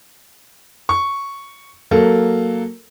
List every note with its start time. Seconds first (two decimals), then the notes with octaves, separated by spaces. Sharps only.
0.89 C#6
1.91 F#3 A#3 A4